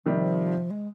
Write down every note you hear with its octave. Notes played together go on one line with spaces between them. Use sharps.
C3 D#3 F3 G3
G#3